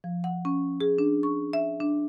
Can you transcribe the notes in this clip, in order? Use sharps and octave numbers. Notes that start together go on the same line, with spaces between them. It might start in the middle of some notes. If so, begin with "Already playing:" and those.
F3
F#5
C#4
G#4
D4
C#6
E5
D4